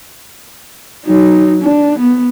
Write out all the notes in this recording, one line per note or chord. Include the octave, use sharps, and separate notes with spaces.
F#3 D#4
D4
B3